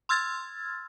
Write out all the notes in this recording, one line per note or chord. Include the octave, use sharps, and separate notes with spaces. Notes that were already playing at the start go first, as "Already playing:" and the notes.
C6 E6 F6 G#6 A6